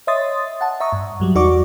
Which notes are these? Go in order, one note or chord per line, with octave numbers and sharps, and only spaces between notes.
C#5 D#5 E5 C6 D#6 A6
F#5 A5
E5 A#5 C#6 D#6
G2
G2 F#3 G3
E2 D#4 F#4 D5 C#6 D6